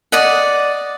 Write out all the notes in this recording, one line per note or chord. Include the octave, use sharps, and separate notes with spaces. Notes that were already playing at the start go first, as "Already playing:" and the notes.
D5 D#5 F#5